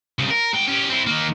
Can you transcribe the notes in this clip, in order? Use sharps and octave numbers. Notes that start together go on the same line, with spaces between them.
C2 C#3
A#4
G#2 G5
C#4 G4
C4 E4
D#3 A#3